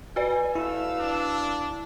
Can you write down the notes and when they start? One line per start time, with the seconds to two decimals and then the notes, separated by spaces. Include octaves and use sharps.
0.16 F#4 B4 D5 G#5
0.55 A3 E4 F5 E6
1.00 D4